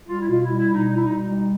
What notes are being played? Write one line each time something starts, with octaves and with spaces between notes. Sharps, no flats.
G3 F4
E4
B2 F4
E4
G3
E4
B2
D#4
G3 D#4
E4
B2 D#4
D#4
G3